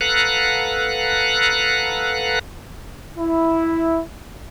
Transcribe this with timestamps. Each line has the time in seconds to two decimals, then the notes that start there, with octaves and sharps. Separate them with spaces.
0.01 A4 B4 F5 F#5 A#5 F#6
3.18 E4